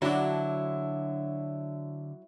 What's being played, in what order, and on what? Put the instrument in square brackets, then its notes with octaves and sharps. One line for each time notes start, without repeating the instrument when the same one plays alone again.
[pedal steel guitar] D3 [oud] F#3 D4 [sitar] E4